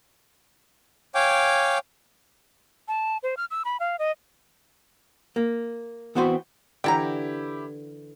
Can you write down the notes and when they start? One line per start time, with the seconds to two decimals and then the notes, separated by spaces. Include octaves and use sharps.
1.15 C#5 F5 G5 G#5 D6
2.88 A5
3.23 C5
3.37 F6
3.51 E6
3.65 B5
3.80 F5
3.99 D#5
5.36 A#3
6.15 E3 B3 C4 F#4 B4 C5
6.84 D3 E3 E4 G4 G5 A5 A#5